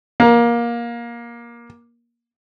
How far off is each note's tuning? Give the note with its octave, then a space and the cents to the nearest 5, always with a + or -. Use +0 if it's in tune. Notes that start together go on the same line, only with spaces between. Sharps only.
A#3 +20